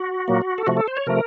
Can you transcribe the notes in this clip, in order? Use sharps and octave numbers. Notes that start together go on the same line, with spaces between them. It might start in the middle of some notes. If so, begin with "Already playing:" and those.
Already playing: F#4
A#2 F#3 A#3
A4
C3 F3 A3 F#4
A4
C5
C#5
C3 F3 A3 A#4